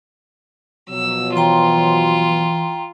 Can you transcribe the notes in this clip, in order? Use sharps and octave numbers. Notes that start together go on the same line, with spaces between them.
B2 F3 F#3 E6
E3 F4 G5 A#5 C6